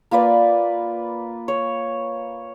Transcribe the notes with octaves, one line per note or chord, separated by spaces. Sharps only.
A#3 F4 B4 D5
C#5